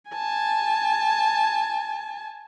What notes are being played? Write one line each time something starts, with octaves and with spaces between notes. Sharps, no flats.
G#5 A5